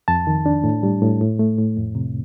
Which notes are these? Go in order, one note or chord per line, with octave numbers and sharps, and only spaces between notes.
F2 A5
D#3
D4
A2
G3
A2
A2
A3
A2
F2
C3